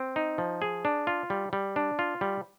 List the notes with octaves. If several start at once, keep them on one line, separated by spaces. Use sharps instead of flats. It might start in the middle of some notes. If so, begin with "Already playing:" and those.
Already playing: C4
D#4
F3
G#4
D4
F4
G3
G3
D4
F4
G3